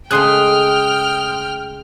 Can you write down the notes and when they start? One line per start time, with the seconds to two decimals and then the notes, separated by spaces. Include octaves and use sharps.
0.11 C#3 G#3 A3 G5 C6 D#6 F6 F#6